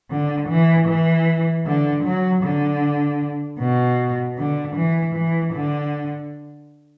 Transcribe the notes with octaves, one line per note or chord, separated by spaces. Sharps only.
D3
E3
E3
D3
F#3
D3
B2
D3
E3
E3
D3